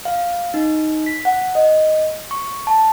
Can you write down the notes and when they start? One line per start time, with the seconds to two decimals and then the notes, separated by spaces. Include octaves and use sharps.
0.05 F5
0.54 D#4
1.06 B6
1.25 F#5
1.55 D#5
2.31 C#6
2.67 A5